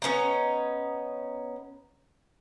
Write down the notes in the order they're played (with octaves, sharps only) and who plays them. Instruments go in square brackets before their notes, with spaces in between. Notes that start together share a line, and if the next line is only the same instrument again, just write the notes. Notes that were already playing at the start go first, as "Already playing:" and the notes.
[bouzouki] B3 C#4 D#4 A#5